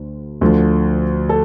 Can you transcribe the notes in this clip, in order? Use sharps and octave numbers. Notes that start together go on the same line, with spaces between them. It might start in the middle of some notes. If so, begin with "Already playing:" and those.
Already playing: D2 D3
D2 D3 F3
A4